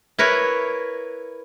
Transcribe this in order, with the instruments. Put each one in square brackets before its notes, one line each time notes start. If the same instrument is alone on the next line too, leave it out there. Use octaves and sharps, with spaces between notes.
[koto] E4 A#4 B4 C#5